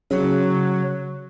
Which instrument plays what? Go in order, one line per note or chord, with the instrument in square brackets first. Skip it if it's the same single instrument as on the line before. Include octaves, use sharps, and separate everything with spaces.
[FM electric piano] C#3 [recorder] F#3